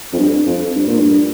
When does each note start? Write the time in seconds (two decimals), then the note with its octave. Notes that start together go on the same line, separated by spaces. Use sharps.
0.13 F2
0.19 G2
0.46 F2
0.75 G2
0.87 A#2
0.99 G2